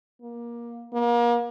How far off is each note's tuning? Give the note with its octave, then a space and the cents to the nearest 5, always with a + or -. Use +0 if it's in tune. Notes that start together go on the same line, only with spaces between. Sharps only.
A#3 +20
A#3 +35